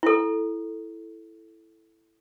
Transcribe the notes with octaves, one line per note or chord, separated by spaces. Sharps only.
E4 A4